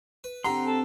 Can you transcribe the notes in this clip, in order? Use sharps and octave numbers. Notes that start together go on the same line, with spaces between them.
B4
D3 C4 G4 F#5 A#5 C6
A4